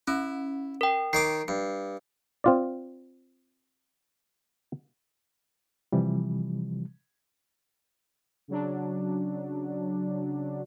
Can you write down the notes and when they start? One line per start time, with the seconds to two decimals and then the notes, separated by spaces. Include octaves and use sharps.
0.08 C#4 E4
0.81 A#4 G5
1.13 D#3 C#5 D6 C7
1.48 G2
2.44 C4 F4 D5
5.92 C3 E3 F3 G3
8.48 C#3 F#3 D4